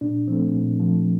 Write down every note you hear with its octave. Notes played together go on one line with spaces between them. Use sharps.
A#2 D4
F3 A3 C4
A#2
F3 A3